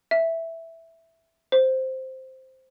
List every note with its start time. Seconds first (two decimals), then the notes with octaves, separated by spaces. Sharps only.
0.11 E5
1.52 C5